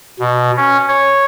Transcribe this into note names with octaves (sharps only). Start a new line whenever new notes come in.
B2
C#4
C#5